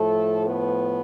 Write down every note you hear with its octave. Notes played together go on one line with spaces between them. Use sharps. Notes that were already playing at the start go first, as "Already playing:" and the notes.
Already playing: A2 F3 A3 A4
B3 B4